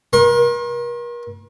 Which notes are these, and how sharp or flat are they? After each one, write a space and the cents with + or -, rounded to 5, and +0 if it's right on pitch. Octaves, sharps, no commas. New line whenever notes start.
A#4 +40 C6 +45